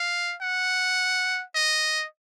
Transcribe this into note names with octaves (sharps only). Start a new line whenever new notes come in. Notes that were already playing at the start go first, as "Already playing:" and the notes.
Already playing: F5
F#5
D#5